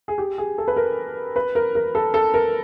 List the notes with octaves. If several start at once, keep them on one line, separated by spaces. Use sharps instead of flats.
G#4
G4
G#4
A4
B4
A#4
B4
A#4
A#4
A4
A4
A#4